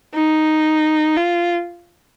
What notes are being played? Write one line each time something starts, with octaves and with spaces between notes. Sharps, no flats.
D#4
F4